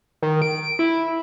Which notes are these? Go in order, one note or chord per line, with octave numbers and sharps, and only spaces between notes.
D#3
D7
E4